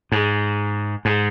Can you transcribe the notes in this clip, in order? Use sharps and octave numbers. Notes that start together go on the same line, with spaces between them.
G#2
G#2